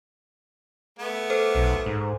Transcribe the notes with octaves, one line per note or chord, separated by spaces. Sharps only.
A3 B3
A4 C5 F6
B1
G#2